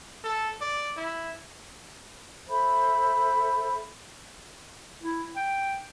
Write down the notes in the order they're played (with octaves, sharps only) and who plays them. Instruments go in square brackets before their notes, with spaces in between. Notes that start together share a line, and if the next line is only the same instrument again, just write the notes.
[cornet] A4
D5
E4
[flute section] A4 C5 E5 B5
[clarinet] E4
G5